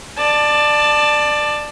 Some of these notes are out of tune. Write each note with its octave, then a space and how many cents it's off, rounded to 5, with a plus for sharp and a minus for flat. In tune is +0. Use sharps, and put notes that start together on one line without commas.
D5 +20 A5 +0